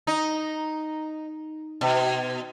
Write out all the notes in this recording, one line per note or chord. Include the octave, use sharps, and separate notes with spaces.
D#4
B2